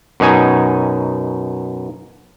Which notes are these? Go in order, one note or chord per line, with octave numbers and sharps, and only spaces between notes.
F#2 B2 D#4 G#5